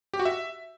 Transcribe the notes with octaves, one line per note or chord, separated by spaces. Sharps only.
G4
F#4
E5